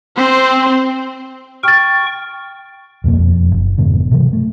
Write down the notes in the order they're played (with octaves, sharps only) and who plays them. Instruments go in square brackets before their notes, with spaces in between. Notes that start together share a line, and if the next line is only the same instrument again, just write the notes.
[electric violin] C4 C5
[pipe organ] G5 C#6 [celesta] F6 A6
[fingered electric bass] D#1 F2 B2 A#3
E1 F2
F#1
F2 G#2 B2 D3
C3 E3 F#3
A3